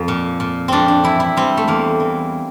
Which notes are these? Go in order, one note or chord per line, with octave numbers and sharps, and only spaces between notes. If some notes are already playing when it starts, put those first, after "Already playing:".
Already playing: F2 F3
A#2
A#2
F2 C4 D4
D4
E3 E4
E4
G3 C4
A3
E2 A#3
E3